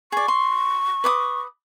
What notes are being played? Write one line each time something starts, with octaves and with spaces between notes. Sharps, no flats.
G#4 D5 C#6
C6
B4 D6 D#6